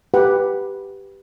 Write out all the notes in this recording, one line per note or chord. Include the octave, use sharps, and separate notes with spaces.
G4 B4 F#5